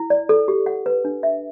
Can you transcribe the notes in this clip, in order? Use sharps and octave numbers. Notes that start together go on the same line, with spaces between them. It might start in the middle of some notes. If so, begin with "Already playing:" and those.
Already playing: E4
D5
A4
G4
F#5
B4
D4
E5